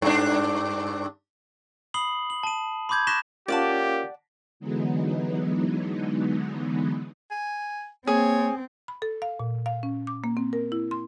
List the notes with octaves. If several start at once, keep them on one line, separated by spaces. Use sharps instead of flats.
G2 D4
B5 D#6 C7 F#7 G7
F#7
A5 D#7
B5 C6 D6 G6 G#6
C#6 F#6 A#6 B6 E7 G7
A#3 C#4 F4 G4 C#5 D5 F#5 A5
D3 E3 F#3 G#3 B3 D#4
G#5
A#3 C4 G#4 C#5
B5
A4
F5
A#2
F5
C#4
D6
A#3
C4
A#4
E4
C6